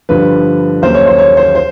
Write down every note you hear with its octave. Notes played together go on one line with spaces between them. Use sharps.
G2 D3 F3 B4
D#2 C#3 F#3 A#3 C5
C#5
C5
C#5
C5
C5